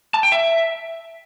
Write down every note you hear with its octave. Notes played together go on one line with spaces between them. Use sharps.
A5
G5
E5